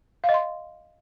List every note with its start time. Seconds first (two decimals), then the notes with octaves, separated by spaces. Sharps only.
0.24 F5
0.29 D#5
0.34 C6